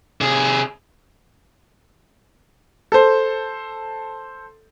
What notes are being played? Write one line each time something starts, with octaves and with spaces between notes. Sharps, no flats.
C3 G#4
A4 C5